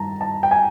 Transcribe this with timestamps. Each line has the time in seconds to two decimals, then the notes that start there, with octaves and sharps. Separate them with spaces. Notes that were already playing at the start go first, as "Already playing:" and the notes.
Already playing: G2 D#3 A5 A#5
0.21 A5
0.43 G5
0.51 G#5